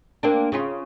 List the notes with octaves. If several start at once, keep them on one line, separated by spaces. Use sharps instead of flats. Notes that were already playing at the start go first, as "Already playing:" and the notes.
A#3 C4 D4
C#3 C#4 F4